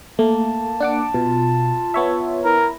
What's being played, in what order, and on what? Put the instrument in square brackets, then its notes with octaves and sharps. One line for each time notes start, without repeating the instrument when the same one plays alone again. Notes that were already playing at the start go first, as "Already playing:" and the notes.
[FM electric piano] A3 [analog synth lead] A#3 [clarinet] A5
[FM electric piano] D4 F#5 D6
[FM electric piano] B2 [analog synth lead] F4
[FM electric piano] B3 C#5 E5
[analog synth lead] E4 [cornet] A#4